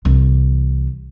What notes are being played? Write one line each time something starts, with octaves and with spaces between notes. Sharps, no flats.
C2 E3